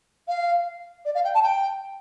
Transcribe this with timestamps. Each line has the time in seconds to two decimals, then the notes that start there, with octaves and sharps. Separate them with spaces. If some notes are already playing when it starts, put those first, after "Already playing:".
0.28 F5
1.05 D5
1.14 F5
1.24 G5
1.34 A5
1.43 G5